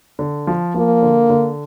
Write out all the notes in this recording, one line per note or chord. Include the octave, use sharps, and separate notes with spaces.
D3
F3
F3 A#3
D3
D3